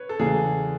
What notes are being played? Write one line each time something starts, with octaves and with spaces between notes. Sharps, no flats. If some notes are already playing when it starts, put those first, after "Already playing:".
Already playing: B4 C#5
A4
E2 C#3 E3 G#4